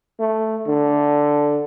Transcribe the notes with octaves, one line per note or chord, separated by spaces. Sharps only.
A3
D3